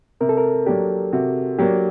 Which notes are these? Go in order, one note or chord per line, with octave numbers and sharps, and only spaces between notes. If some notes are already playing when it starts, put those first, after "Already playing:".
C3 A#4
A4
A#4
F#3 A#3 D4 G4
C3 F#4
F#3 A#3 D4 G4